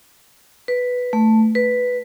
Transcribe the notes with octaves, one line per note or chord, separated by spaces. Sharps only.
B4
A3
B4